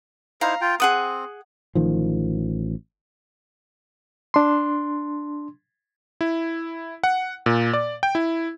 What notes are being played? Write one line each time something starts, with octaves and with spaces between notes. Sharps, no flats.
D#4 E4 C5 F5 A#5
F4 G5
C4 G#4 F#5 D#6
A1 D#3 F3
D4 C6
E4
F#5
A#2
D5
G5
E4